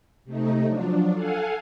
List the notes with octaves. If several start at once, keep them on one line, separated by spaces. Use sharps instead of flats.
C3 A3 D#4
F3 F#3 D4
A4 F5 F#5 G#5